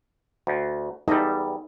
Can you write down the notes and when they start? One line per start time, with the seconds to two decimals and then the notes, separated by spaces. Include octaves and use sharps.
0.47 D2
1.08 E2 G3 D#4 A4 D#5